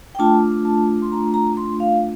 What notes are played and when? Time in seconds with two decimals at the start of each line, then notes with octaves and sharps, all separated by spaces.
0.15 G5
0.19 A3 D4 F4 A5
0.65 A5
1.02 C6
1.12 A#5
1.34 A#5
1.57 C6
1.80 F5